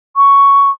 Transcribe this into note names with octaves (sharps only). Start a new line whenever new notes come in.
C#6